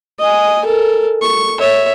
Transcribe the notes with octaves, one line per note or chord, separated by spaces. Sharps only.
D#5 G#5
A4 A#4
C#6
C#5 E5